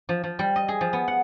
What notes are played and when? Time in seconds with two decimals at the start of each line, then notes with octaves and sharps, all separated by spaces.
0.09 F3
0.23 F3
0.39 G3
0.56 D#5
0.68 G#4
0.81 F3
0.93 B3
1.08 F#5